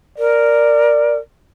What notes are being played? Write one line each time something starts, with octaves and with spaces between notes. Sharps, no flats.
A#4 D5